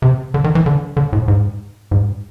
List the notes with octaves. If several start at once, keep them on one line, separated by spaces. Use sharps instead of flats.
C3
D3
D#3
E3
D3
D3
A2
G#2
G#2